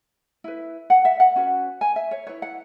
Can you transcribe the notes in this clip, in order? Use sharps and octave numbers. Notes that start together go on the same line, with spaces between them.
E4 B4
F#5
E5
F#5
C#4 F#4 B4
G#5
E5
C#5
E4 B4 C#5
F#5